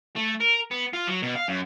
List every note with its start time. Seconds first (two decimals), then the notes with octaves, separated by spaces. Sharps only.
0.16 A3
0.40 A#4
0.71 B3
0.93 F4
1.07 F#3
1.23 B2
1.35 F5
1.48 F#2